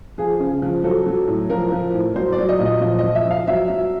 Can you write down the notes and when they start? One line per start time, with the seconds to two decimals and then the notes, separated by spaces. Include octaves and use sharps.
0.18 F3 G#4
0.40 C#3
0.62 F3
0.84 F#3 A4
1.06 F#3
1.27 A2
1.50 F3 A#4
1.72 F3
1.94 A2
2.16 F#3 C5
2.33 D5
2.38 F#3
2.49 D#5
2.59 A#2
2.65 D#5
2.81 F3 D#5
2.99 F3 D#5
3.15 E5
3.25 F3
3.31 F5
3.47 F#3 E5
3.70 F#3